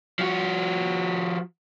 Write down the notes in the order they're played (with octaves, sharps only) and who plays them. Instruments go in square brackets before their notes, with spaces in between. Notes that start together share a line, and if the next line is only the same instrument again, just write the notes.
[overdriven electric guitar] F3 F#4